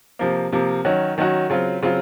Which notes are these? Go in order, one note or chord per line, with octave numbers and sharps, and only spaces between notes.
C3 F3 A#3
C3 F3 A#3
D#3 F#3 C#4 F#4
D#3 F#3 C#4 F#4
C#3 F#3 C4 F4
C#3 F#3 C4 F4